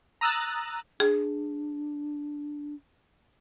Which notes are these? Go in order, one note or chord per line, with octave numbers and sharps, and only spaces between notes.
A#5 D#6 E6 F#6 A6
D4 G#4